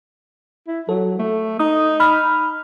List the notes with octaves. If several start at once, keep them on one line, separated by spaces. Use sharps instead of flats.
E4
F#3 A4
A3
D#4 D#6
B5 F6